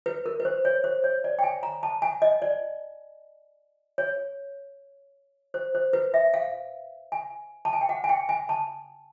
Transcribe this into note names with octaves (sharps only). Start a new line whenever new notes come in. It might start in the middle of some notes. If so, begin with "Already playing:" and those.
B4
A#4
B4
C5
C#5
C5
C#5
D5
G5
G#5
A#5
A5
G#5
D#5
D5
C#5
C5
C5
B4
E5
F5
G#5
A5
G#5
G5
F#5
G#5
G5
G#5
A5